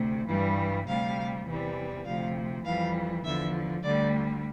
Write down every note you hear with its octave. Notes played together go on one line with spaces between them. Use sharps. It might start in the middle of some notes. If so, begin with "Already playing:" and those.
Already playing: D2 C3
G2 E3 G3
D2 C3 G3 F5
E2 C3 E3 G3
D2 C3 F3 F5
F2 E3 G3 F5
E2 D3 F3 E5
D2 D3 G3 D5